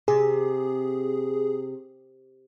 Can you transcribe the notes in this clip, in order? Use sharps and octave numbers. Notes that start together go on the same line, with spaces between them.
C3 G#4